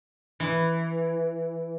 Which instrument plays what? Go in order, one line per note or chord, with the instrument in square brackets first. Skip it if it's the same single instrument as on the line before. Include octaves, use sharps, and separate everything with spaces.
[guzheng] E3